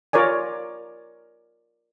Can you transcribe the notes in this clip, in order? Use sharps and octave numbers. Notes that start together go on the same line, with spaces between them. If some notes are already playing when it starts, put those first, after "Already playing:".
F4 A#4 C#5 D5 G#5